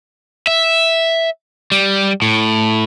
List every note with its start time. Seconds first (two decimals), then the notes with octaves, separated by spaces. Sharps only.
0.47 E5
1.72 G3
2.22 A2